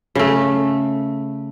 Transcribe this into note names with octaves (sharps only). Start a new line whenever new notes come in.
C#3 A3